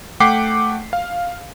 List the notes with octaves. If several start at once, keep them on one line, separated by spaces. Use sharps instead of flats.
A3 F#5 G5 D6 B6 C7
F5